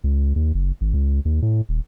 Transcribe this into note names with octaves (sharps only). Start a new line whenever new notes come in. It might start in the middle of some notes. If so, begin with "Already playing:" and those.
C#2
D#2
F#1
G#1
C#2
D#2
A2
D#1